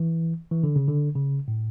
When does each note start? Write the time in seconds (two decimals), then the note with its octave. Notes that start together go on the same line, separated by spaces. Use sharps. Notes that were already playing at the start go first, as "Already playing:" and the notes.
Already playing: E3
0.51 E3
0.63 D3
0.76 C#3
0.88 D3
1.16 C#3
1.48 A2